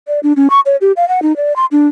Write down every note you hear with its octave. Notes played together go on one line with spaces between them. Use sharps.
D5
D4
C#4
C#6
C#5
G4
F5
F#5
D#4
D5
C6
D4